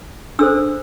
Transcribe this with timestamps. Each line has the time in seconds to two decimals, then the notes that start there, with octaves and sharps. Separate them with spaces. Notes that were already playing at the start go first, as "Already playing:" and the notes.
0.39 D4 A4 C5 E6